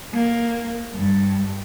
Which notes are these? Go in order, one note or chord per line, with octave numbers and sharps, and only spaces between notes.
A#3
G2